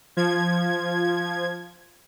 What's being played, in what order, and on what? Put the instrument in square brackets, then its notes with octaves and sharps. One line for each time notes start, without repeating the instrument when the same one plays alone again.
[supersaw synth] F3 G#6